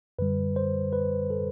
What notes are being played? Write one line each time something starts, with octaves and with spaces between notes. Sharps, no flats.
F#2 D3 G3 B4
C5
B4
A4